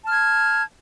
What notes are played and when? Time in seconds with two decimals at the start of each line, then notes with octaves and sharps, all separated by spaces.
0.02 A5
0.06 F6
0.10 G#6